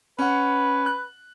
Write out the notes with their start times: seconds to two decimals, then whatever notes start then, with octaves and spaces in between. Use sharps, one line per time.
0.19 C#4 B4 F#5
0.86 F#6